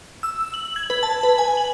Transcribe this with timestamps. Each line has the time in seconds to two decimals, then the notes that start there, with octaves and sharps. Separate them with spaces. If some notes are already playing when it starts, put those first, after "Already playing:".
0.23 E6
0.54 F#7
0.76 G#6
0.90 B4
1.03 A5
1.23 B4
1.38 G#5
1.57 F#7